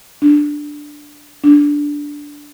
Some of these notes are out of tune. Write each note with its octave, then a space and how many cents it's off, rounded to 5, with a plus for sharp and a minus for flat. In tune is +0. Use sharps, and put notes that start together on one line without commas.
D4 +5
D4 -5